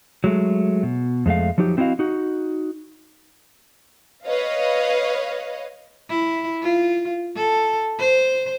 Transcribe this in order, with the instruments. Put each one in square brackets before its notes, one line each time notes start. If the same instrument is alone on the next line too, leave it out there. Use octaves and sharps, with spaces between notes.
[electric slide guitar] F#3 G#3 A3
B2
F2 G#3 A3 F5
F3 F#3 D#4 G4
A3 C4 E4 F#4 D#5 F5
D#4 F#4
[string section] B4 C#5 D#5 F5
[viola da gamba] E4
F4
A4
C5